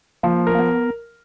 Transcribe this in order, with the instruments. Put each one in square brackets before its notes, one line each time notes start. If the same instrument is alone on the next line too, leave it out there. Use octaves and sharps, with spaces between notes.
[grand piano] F3 [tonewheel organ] A#3
[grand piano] A#4
[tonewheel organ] A#3
B3